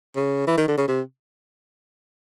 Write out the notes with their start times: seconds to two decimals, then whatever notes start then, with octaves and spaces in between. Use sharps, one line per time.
0.16 C#3
0.47 E3
0.58 D#3
0.68 D3
0.78 C#3
0.88 C3